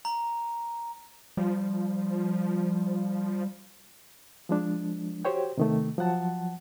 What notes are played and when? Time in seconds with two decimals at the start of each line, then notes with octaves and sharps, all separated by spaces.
0.05 A#5
1.37 F3 G3
4.49 F3 G#3 D4
5.25 F#4 G4 C5 C#5 G5
5.58 C3 D#3 A3
5.98 F3 F#3 F#5 A5